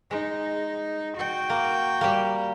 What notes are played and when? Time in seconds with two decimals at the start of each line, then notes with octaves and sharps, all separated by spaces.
0.11 G#3 D#4
1.17 F#4 G5
1.50 A#3
2.01 G3 A#3